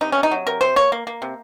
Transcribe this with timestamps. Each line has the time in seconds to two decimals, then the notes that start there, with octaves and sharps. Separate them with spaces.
0.01 C3 D#4
0.12 C3 C#4
0.23 D#4
0.31 F#3
0.46 C3 A#4
0.61 C3 C5
0.76 A#3 C#5
0.92 A#3
1.07 A#3
1.22 C3